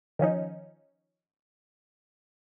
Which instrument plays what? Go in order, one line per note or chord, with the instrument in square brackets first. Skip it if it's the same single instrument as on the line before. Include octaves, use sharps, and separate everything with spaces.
[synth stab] D#3 F3 C#4 D#4